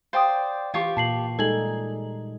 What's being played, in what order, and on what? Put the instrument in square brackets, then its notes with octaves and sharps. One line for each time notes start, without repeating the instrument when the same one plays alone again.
[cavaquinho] C5 D5 [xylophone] F5 G5 D#6
[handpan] E3 [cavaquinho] F4 G4 C#6
[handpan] A#2 [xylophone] A5 C7 F#7
[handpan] G3 G#3 D#4 [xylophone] A4 F#7 [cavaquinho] G#5